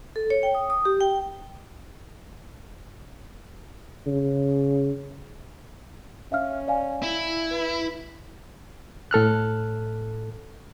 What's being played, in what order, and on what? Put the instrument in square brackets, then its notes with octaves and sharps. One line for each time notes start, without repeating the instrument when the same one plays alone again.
[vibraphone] A4
C#5
G5
D#6
D#6
G4
G5
[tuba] C#3
[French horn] C#4 [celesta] E5 F5 F6
[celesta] D5 F5 G#5
[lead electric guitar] E4
[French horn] B4
[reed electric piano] A2 A4 F6 F#6